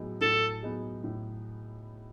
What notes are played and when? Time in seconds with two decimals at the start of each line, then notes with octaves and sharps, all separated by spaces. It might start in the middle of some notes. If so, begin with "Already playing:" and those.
Already playing: A2 F#3 B3 D#4 G#4
0.21 A2 A4
0.63 F#3 B3 D#4 G#4
1.04 A2